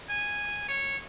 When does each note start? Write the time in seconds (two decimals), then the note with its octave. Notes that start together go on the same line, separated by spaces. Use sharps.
0.10 G#5
0.69 C#5